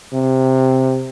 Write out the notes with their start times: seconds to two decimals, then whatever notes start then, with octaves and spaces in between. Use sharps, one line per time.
0.13 C3